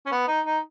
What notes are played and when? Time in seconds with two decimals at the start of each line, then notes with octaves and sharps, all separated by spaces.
0.06 C#4
0.12 B3
0.28 D#4
0.46 D#4